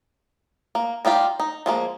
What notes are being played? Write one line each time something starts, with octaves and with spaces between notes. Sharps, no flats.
A#3
G3 D#4 F4 G4
D#4
F3 G#3 A#3